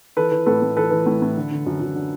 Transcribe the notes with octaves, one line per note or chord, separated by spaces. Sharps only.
E3 A4 B4
E3
A2 A4 B4
A2
E3 A4 B4
E3
A2
A2
D3
D3
F#2
F#2
D3